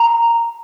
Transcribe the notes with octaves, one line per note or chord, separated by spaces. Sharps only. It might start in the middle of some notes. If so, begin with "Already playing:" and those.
Already playing: A#5